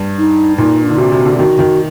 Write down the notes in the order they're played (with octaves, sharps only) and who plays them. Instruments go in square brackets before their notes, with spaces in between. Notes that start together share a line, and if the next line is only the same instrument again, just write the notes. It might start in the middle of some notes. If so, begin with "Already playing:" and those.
Already playing: [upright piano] G2
[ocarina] D#4
[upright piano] A#2 [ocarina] D#4
[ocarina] D4
[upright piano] D3 [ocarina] D#4
[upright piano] C3 [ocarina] F#4
[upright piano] C3
D3
[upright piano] D#3 [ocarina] F#4
[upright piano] D#3